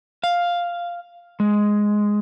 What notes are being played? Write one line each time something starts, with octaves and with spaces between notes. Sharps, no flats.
F5
G#3